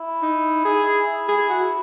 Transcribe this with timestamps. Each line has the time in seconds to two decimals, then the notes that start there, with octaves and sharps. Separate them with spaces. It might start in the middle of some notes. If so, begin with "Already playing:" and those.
Already playing: E4
0.22 D#4
0.65 G#4
1.07 E4
1.28 G#4
1.50 F#4